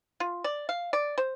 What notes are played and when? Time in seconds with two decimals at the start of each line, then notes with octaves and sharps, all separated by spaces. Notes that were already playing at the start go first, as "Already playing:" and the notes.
0.20 F4
0.44 D5
0.69 F5
0.93 D5
1.18 C5